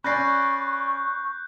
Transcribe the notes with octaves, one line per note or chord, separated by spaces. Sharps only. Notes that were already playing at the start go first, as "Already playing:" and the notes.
C#4 D5 B5 C#6 F#6 G6 A#6 C7